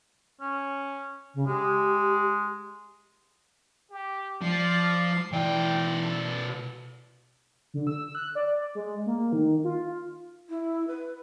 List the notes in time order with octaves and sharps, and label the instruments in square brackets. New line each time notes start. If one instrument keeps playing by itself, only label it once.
[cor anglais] C#4
[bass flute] C#3
[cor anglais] G#3 [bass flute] G4
[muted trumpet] G4
[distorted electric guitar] F3 [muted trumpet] D5 [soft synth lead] C7
[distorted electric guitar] B2 D5 [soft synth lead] E3 [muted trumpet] G5
[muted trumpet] A4
[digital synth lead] D3
E6
F#6
D5
G#3
A#3
D#3
F4
[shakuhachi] E4
B4